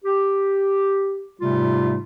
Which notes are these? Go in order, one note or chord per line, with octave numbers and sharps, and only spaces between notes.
G4
G#2 C3 G3 A3 F4